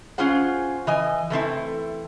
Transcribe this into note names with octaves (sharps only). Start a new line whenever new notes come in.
C#4 F4 G#4 C5 F#5
E3 D#5 G#5
E3 A3 C4 E4